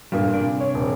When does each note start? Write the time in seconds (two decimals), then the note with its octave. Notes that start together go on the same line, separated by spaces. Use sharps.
0.12 G2 A#2 G3
0.33 C3 D4
0.60 C#5
0.74 D#1